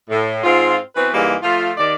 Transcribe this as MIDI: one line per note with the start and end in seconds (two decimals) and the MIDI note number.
0.10 0.42 45
0.44 0.76 44
0.44 0.76 60
0.44 0.76 65
0.95 1.10 52
0.95 1.10 59
0.95 1.10 60
0.95 1.10 66
0.95 1.10 71
1.14 1.36 44
1.14 1.36 52
1.14 1.36 55
1.14 1.36 56
1.14 1.36 58
1.43 1.72 53
1.43 1.72 57
1.43 1.72 65
1.77 1.95 39
1.77 1.95 51
1.77 1.95 74